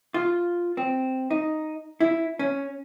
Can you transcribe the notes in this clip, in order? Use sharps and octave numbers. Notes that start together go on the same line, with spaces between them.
F4
C4
D#4
E4
C#4